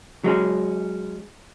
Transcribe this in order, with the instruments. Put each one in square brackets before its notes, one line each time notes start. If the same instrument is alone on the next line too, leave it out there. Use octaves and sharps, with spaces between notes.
[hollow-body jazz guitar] F#3 G#3 C#4